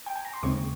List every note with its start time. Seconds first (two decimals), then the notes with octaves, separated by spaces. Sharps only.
0.06 G5
0.16 G#5
0.25 A#5
0.33 C6
0.43 D#2 C#3 G#3 C4 C#6